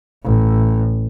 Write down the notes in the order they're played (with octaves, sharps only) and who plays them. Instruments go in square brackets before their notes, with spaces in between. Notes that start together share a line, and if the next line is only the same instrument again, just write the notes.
[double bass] A1